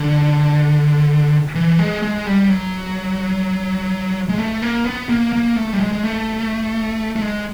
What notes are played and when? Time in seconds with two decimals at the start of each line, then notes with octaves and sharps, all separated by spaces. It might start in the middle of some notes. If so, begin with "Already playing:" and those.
Already playing: D3
1.55 E3
1.79 G#3
2.02 G#3
2.26 G3
2.50 F#3
4.29 G#3
4.38 A3
4.62 A#3
4.85 B3
5.09 A#3
5.33 A#3
5.56 A3
5.73 G3
5.80 G#3
5.93 G#3
6.03 A3
7.16 A3
7.21 G#3